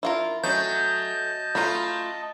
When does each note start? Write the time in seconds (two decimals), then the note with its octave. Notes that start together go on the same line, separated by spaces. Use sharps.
0.03 E4 F4 A#4
0.44 F#3 A3 C#4 D#5 A5 G6
1.55 A3 F4 A#5 B5